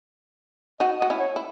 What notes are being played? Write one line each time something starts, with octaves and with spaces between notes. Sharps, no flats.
D#4 F#4 D#5
F#4 D#5
C#4 E4
C#5
E4